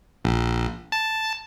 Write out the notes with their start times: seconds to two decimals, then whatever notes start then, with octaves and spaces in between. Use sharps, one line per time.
0.25 A#1
0.92 A5